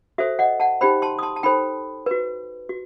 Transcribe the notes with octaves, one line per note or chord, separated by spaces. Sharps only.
F#4 A4 C5 E5
D#5 F#5
F#5 A5
D#4 G4 C5 G5 B5
A5 C6
D#6
A5 C6
A5
D#4 A4 C5 G5 B5
F#4 B4
F#4